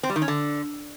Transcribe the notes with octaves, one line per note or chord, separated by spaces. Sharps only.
C4
G3
D#3
C#4
D3